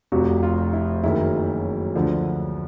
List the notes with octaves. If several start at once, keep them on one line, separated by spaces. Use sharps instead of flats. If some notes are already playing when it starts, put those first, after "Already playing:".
F1 F2 C3 F3 F#4
F4
E4
F#1 F#2 D#3 E4
D2 D3 F3